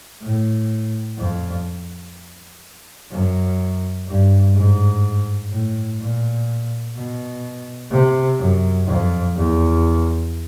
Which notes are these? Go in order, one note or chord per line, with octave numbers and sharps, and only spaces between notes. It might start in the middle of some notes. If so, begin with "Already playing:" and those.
A2
F2
F#2
G2
G#2
A2
A#2
B2
C3
F#2
F2
E2